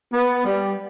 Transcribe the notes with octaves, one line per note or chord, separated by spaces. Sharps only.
B3
G3